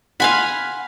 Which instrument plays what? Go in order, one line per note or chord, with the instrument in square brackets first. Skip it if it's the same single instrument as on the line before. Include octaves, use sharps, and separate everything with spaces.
[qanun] F5 G#5 B5 [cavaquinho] F#5 C6